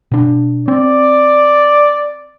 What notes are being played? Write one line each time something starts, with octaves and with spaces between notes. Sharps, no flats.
B2 D4
C4 D5